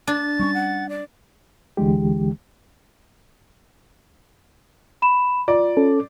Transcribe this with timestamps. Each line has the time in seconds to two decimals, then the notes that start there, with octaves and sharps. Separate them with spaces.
0.07 D4 A6
0.39 G3 C4 C#4 C#6
0.54 F#5
0.89 D5
1.77 D2 D3 E3 G#3 G4
5.02 B5 E7
5.48 F4 D5
5.77 C#4 A4